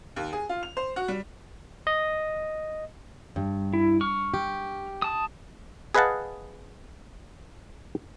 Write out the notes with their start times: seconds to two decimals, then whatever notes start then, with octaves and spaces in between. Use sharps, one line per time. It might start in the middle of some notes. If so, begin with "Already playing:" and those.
0.16 D#2
0.33 G#4
0.49 F4
0.63 F7
0.77 C5
0.96 F#4
1.08 G3
1.87 D#5
3.36 G2
3.74 E4
4.01 C#6 F6
4.34 G4
5.02 A5 D#6
5.95 G#4 B4 D#5 F5 F#5 A5